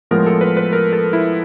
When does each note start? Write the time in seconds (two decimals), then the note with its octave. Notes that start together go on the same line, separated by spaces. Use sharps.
0.11 A2 F3 G#3 B3 A#4
0.26 A4
0.41 B4
0.57 B4
0.73 A#4
0.93 A4
1.13 E4